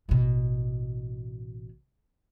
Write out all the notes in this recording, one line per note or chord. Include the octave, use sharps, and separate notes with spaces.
A1 B2